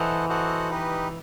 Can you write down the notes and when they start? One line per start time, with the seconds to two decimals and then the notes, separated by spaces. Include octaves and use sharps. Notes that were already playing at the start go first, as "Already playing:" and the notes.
Already playing: E3 A4 C5 D#5 F#5
0.29 F#4 A4 C5 D#5 F#5
0.70 D#4 G4 B4 D#5